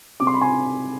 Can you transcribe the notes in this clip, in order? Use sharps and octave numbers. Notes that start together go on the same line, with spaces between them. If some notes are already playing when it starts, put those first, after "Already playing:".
C3 D6
C6
B5
G#5 C6